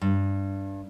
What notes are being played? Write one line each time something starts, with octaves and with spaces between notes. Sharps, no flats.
G2